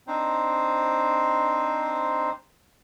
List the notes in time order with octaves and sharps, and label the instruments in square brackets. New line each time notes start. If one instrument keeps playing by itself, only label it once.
[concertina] C4 D4 D#4 C5